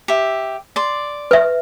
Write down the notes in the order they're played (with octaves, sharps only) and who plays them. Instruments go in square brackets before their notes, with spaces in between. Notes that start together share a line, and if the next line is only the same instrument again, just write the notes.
[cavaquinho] G4 E5
D5 C6
[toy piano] B4 E5